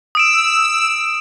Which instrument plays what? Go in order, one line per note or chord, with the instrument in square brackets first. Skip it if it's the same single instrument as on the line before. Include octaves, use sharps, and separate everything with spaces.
[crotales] D#6 D7 E7 [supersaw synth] E6